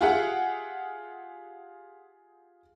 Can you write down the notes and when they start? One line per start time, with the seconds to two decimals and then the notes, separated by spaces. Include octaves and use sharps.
0.01 F4 G4 G#4 E5 F#5